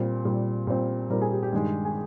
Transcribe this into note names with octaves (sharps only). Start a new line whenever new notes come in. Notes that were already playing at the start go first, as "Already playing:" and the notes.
Already playing: A#2 G3 C4
A#2 G3 C4
A#2 G3 C4
A#2 G3 C4 A#4
G#4
G4
G4
G2 D#3 G#3
G#4